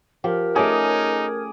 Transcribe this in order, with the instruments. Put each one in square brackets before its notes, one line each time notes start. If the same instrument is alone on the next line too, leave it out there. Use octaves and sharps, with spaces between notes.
[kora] F3 [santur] G4 [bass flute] A#4
[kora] A3 C#4 [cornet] D#4 [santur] G#4 D6